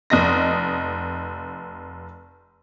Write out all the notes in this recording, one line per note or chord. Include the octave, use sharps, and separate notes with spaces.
F1 D#5 A#6